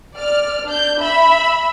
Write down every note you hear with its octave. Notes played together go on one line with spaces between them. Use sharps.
D5 F6
D4 G6
E5 B5